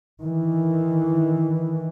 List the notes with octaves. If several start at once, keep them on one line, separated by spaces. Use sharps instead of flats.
D#3 E3